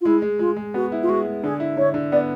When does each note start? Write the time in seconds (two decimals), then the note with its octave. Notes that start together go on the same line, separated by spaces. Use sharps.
0.01 F4
0.05 G#3 E4
0.22 G#3
0.39 G#3 F4
0.56 G#3
0.74 B3 F#4
0.92 E4
1.02 F4
1.09 G#3 F#4
1.26 G#3
1.43 D3 G#4
1.60 E4
1.77 D3 C#5
1.94 D3
2.12 B3 D5